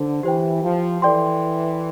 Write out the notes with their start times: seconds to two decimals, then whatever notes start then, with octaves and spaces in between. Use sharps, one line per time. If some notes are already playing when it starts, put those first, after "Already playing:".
Already playing: D3 C5
0.23 E3 G4 C5 G5
0.63 F3
1.02 E3 A4 D5 G5 C6